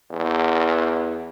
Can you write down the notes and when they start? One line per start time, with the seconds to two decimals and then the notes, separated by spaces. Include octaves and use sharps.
0.11 E2